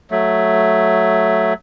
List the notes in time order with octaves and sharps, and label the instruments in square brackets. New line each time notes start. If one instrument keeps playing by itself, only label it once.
[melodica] F#3 A3